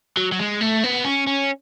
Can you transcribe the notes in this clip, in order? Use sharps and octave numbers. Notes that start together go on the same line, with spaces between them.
F#3
F#3
G#3
A3
B3
C#4
C#4